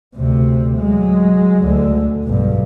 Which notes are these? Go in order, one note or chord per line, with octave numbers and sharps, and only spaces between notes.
D2 C3
F#3 G#3
D2 D3
B1 G2